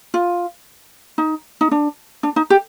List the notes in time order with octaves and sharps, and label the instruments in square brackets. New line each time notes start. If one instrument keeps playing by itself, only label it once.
[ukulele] F4
D#4
D#4
D4
D4
D#4
G4